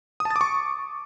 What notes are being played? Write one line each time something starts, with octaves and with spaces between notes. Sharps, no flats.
D#6
A5
A6
D6
C#6